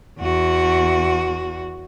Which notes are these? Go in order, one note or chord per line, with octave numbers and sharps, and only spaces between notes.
E2 F#4